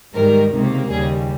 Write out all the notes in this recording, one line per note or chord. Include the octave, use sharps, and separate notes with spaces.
G#2 D#3 G3 A#4
C#2 C3 D#3 A#3
D#2 C#3 G3 G#4